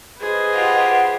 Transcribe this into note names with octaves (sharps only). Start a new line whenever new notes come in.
G#4 B4 C5 D#5
F4 G4 F#5